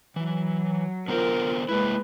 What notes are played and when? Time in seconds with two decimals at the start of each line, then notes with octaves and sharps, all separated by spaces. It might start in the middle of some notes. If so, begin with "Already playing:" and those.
0.16 E3 F#3
1.08 D3 B3 F4 A#4 C5
1.69 G#3 A#3 E4 B4